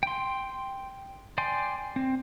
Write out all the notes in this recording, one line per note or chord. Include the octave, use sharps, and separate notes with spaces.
G5 C6
D5 G5 G#5 C6
C4